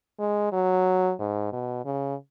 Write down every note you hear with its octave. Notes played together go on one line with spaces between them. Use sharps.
G#3
F#3
G#2
B2
C#3